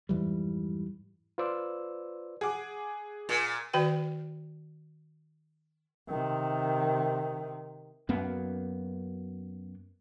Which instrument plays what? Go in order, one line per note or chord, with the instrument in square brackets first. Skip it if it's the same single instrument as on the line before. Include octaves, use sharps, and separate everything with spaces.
[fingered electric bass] F2 G#2 E3 G3
[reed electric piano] F4 B4 C5 D5 E6
[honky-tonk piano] G#4 F#5 D6
[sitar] A#2
[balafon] D#3 F#4 B4 D5 G5
[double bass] C3 D#3
[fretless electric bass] F#2 A#3 B3